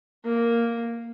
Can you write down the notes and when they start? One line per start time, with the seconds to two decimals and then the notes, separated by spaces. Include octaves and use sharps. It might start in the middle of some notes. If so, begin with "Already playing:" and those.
0.25 A#3